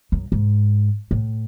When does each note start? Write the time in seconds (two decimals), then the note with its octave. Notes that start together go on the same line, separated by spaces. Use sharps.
0.12 F#2
0.32 G#2
1.11 A2